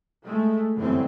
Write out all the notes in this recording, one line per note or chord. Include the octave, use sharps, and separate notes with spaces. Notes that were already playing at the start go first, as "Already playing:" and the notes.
G#3 A3
G1 F#2 D3 E3 A3 C4